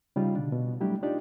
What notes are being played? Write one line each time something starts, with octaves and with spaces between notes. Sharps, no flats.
C#3 G3 D#4 F4
B2 D3 D4
B2
F#3 G3 A3 D4 E4 G4
D4 D#4 F4 G4 D5